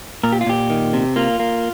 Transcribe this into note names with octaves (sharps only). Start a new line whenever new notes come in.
A#2 A#4
G4
F4
A#2 G4
D#3
C3
A#3 F4
A#3